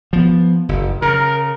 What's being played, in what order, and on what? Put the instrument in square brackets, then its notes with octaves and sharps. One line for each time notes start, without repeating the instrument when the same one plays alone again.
[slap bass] F3 B3
F#1
[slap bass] C#3 [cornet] A#4